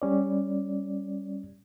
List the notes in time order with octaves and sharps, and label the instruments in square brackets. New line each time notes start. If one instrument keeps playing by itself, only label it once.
[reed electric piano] G3 C#4 D5